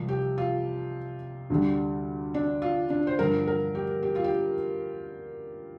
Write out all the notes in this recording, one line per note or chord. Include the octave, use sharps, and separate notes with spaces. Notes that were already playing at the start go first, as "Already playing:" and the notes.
Already playing: C2 C3 F3
G4
F4
D2 D3 G3
D4
F4
D4
C5
G2 D3 F3 A#4
A#4
G4
G4
F4
G4